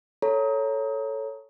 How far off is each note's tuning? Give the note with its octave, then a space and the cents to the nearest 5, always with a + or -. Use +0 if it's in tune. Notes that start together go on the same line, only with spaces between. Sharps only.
A4 +0 C#5 +0 A#5 +0